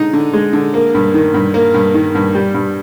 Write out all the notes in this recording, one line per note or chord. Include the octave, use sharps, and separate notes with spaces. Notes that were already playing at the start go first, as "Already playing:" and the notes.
Already playing: D3 G#3 D#4
D3
G#3
D3
A#3
G2
D#3
G2
A#3
G2
D#3
G2
G3
G2